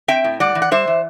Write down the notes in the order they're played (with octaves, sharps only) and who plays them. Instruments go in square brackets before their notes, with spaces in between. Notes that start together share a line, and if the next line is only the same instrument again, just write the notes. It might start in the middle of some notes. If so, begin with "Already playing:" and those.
[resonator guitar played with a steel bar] C4 E5 G5
A2
G3 D5 F#5
E3
F#5
G3 C5 E5
E3